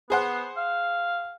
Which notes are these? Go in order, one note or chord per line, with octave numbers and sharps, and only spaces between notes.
B3 G#4 C5 F#5
F5